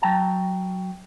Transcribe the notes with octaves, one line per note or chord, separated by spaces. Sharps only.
F#3 G5 A5 A#5